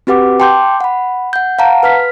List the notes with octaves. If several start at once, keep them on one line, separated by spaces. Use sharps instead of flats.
C4 F#4 G4 B4 F#5 D6
G5 A5 C6 D6 G6
F#5 B5
F#5 G6
F5 F#5 A5 A#5
B4 F6 B6